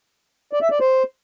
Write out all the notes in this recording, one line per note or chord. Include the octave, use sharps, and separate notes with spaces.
D5
E5
D5
C5